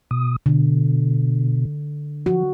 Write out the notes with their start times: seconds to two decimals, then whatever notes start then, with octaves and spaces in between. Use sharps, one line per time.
0.11 B2 D#6
0.46 B2 D3
2.26 F3 F#4